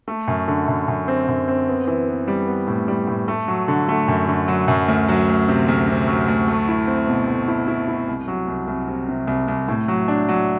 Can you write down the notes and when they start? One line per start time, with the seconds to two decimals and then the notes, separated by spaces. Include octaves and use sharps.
0.08 A3
0.28 F#2
0.48 D3
0.68 F#2
0.88 F#2
1.08 C4
1.28 F#2
1.48 C4
1.68 B3
1.87 E3
2.08 B3
2.28 G3
2.47 B3
2.67 A2
2.88 G3
3.07 A2
3.28 A3
3.48 F#3
3.68 D3
3.88 A3
4.08 F#2
4.28 D3
4.48 F#3
4.68 F#2
4.88 D2
5.08 F#3
5.28 D2
5.48 C3
5.68 D2
5.88 C3
6.08 F#3
6.28 D2
6.48 A3
6.68 E4
6.87 C4
7.07 B2
7.28 A3
7.48 E4
7.68 E4
7.88 E4
8.08 C2
8.28 F#3
8.48 C2
8.67 C2
8.88 C3
9.08 C3
9.27 C2
9.48 C2
9.68 A2
9.88 F#3
10.08 D4
10.28 F#3